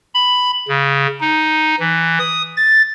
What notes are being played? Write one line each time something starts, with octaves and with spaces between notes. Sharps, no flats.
B5
C#3
D#4
E3
D#6
A6